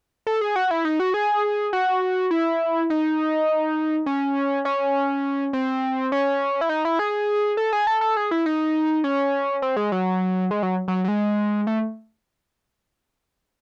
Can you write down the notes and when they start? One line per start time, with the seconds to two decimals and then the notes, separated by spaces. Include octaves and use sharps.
0.27 A4
0.41 G#4
0.56 F#4
0.71 E4
0.85 D#4
1.00 F#4
1.14 G#4
1.73 F#4
2.31 E4
2.90 D#4
4.06 C#4
4.65 C#4
5.53 C4
6.12 C#4
6.61 E4
6.69 D#4
6.85 E4
6.99 G#4
7.57 A4
7.72 G#4
7.87 A4
8.01 A4
8.16 G#4
8.31 E4
8.46 D#4
9.04 C#4
9.62 C4
9.76 G#3
9.92 F#3
10.51 G#3
10.63 F#3
10.88 F#3
11.04 F#3
11.08 G#3
11.67 A3